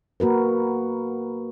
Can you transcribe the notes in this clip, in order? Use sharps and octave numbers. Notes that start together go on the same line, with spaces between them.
A#3 F#4 A#4 B4